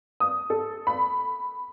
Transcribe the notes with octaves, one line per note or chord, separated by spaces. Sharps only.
D#6
A4
B5